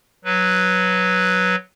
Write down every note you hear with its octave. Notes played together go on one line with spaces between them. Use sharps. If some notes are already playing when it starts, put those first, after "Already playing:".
F#3 B4